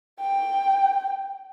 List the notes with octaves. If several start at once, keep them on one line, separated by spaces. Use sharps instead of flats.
G5